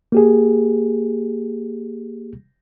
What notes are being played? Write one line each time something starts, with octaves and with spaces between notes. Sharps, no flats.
A#3 G4 G#4